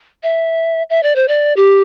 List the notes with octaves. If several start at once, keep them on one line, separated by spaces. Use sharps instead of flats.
E5
E5
D5
C5
D5
G4